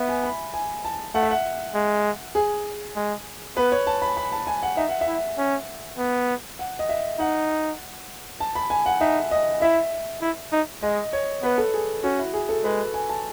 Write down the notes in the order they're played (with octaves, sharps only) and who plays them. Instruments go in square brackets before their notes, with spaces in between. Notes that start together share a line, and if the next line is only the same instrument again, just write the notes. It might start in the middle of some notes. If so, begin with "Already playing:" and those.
Already playing: [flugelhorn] B3 [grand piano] E5
[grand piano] G#5
B5
G#5
A5
[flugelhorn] A3 [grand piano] F#5
[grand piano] E5
F#5
[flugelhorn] G#3
[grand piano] G#4
[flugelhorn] G#3
[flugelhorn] B3 [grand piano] B4
[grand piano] C#5
A5
B5
B5
A5
G#5
F#5
[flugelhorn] D#4 [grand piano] E5
[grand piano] F#5
E5
[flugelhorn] E4
C#4
B3
[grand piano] F#5
D#5
E5
[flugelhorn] D#4 [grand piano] F#5
[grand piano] A5
B5
G#5
F#5
[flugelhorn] D#4 [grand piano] E5
[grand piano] D#5
[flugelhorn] E4 [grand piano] E5
[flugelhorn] E4
D#4
[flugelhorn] G#3 [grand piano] D#5
[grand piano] C#5
[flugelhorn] B3 [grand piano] B4
[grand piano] A4
G#4
[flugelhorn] C#4 [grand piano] F#4
[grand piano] E4
G#4
A4
[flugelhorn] G#3 [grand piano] B4
[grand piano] G#5
A5